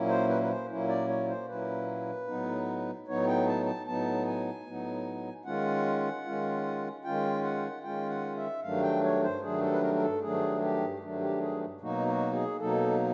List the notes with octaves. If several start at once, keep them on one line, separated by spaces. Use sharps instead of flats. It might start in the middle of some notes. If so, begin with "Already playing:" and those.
Already playing: A#2 F#3 A#3 C#4 E4
C5
B4
B4
C5
A#2 F#3 A#3 C#4 E4
D5
C#5
C5
A#2 F#3 A#3 C#4 E4 B4
A2 F#3 B3 D#4
A2 F#3 B3 D#4 C#5
G5
A5
A5
A2 F#3 B3 D#4 A5
G#5
A2 F#3 B3 D#4
D#3 G#3 C#4 F4 F#5
D#3 G#3 C#4 F4
D#3 G#3 C#4 F4 G5
F#5
D#3 G#3 C#4 F4 G5
F#5
E5
G2 D#3 F#3 A3 D4 F5
G5
C#5
C5
G2 D#3 F#3 A3 D4 G#4
A4
B4
A#4
A#4
A4
G2 D#3 F#3 A3 D4 G#4
G4
G2 D#3 F#3 A3 D4
G4
G#4
B2 F#3 A#3 D#4 F#4
F#4
G#4
B2 F#3 A#3 D#4 A4